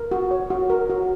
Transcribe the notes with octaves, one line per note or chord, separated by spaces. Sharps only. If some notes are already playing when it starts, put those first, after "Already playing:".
Already playing: A#4
F#4
C#5
F#4
A#4
F#4